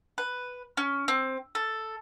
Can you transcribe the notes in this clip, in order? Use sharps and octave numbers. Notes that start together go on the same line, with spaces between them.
B4
C#4
C4
A4